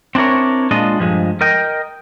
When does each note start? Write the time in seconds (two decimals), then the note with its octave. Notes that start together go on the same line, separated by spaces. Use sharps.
0.15 C4 D4 E4 A#4 C#5
0.71 A#2 G#3 D4 F4 D#5
0.99 G2 F3 G#3
1.41 A#4 D#5 G5